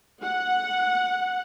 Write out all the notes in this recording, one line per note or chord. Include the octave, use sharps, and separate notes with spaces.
F#5